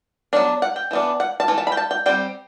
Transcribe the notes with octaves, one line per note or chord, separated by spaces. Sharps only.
F#3 B3 D4
F#5
G5
E3 B3 D4
F#5
A5
E3 A3
A5
B5
G5
A5
G5
G3 C4 G5